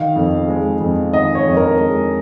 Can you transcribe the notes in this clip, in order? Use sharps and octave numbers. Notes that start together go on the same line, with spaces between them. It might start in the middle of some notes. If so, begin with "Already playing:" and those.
Already playing: D#3 F5
F2
G#3
F2
D#3 D#5
C#5
F2
A#4
G#3